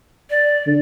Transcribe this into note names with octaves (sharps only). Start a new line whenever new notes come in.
D5
D3